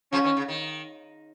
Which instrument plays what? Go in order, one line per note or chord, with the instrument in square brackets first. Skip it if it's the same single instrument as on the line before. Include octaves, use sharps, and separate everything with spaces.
[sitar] C#3 F3 [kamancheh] C#4
[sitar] D#3
C#3
D#3